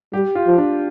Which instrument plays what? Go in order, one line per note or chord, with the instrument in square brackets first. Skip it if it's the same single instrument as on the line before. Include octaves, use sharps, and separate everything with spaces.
[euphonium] G3 [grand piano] G4
[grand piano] F4
[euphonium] F3
[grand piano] D4